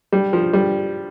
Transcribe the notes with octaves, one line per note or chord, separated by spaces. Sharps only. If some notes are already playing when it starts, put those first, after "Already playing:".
G3
F3
G3